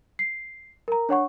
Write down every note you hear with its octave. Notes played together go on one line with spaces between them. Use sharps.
C7
A#4 A#5
D4 C#5 F#5 C#6